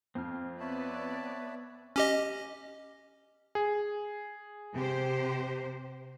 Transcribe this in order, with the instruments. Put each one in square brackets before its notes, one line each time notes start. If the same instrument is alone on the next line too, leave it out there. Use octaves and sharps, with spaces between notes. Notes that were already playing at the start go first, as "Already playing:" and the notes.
[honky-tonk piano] F2 [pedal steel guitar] C4 F6
[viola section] B3 B4 D5 [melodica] C#5 E5 A5
[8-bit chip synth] C#4 G4 D#5
[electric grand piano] G#4
[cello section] C3 G4 C5